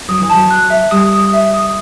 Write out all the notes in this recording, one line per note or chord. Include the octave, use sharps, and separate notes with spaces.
F#3 D#6
E3
F#3 A5
F#6
E5
G3 D#6
D#6
E5
D#6